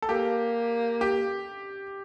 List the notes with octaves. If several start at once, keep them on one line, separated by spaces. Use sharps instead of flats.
A4
A#3 G4
G4